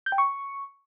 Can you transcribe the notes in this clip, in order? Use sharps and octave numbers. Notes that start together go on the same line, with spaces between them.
G6
G5
C#6